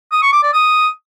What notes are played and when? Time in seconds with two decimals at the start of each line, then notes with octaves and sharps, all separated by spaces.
0.12 D#6
0.22 C#6
0.33 D6
0.43 D5
0.53 D#6